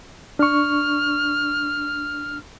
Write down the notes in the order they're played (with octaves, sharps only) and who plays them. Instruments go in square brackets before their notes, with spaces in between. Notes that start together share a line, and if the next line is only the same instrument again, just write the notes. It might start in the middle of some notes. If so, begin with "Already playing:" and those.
[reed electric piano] D4 C#6 [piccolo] F6